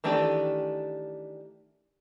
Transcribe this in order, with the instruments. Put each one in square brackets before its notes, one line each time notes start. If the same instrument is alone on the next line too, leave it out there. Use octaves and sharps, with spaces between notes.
[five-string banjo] D#3 E3 A3 D4 G4